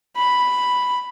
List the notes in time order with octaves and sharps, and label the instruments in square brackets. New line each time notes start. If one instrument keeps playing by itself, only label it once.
[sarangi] B5